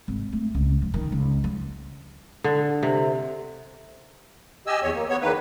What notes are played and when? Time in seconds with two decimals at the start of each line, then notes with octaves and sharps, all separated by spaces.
0.08 G#1
0.33 A3
0.55 C#2
0.82 F3
0.94 D#3
1.12 C#2
1.44 F3
2.44 D3
2.83 C3
4.67 G4 D#5 G#5 E6
4.83 E2 C#5
4.95 A#3
5.09 B3 C#5
5.21 E2 D#3 A#3 B4